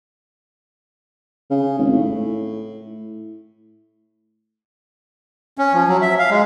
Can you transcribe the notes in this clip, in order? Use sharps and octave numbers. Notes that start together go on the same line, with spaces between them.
C#3
G#1
A2
C#4
F3
F#3
E5
F5
G#3